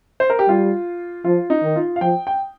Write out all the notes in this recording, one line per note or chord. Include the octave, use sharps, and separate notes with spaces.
C5
A#4
G4
G3 F4
F3 F4
D#4
D#3
F4
F5
F3 G5
G5